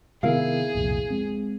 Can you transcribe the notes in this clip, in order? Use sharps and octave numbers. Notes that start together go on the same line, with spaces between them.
C3 D#3 B3 E4 G#4 A#4 F5
C2 F2 A#2
G#3 C4